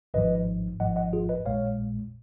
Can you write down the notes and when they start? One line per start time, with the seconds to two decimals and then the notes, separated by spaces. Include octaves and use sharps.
0.14 G#1 G#2 F3 B4 D#5
0.80 G#1 G#2 F3 D#5 F#5
0.96 D#5 F#5
1.13 F4 G#4
1.29 B4 D#5
1.45 A#1 A#2 G#3 C#5 F5